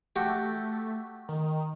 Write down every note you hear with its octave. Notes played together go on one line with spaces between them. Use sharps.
A3 F#4 G4
D#3